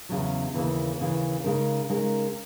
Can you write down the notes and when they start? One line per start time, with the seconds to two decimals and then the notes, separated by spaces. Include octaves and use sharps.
0.09 E2 C#3 F#3
0.54 D#2 C#3 E3
1.00 D#2 C#3 E3
1.44 C#3 G#3 D#4 A#4
1.90 C#3 G#3 D#4 A#4